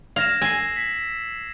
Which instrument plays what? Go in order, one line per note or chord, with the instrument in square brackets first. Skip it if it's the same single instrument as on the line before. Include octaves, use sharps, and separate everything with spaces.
[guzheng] F5 [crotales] G#6 A#6 E7
[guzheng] G#5 [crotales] E6 C7
[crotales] B6